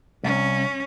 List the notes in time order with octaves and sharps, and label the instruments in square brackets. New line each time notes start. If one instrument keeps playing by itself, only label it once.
[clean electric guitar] C2 [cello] C#4